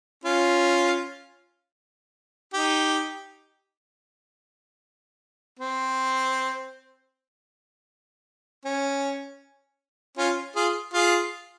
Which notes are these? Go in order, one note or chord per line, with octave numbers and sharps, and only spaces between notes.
C#4 F4
D#4 G4
C4
C#4
C#4 F4
F4 G#4
F4 G#4